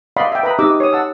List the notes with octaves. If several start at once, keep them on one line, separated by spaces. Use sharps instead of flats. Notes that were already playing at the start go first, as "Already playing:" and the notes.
D5 D#5 F5 F#5 B5 C6
E5 G5
B4 A#5 B5 D#6
D#4 G4 D#5 D6 E6
C#5 D#6
F#5 A5 E6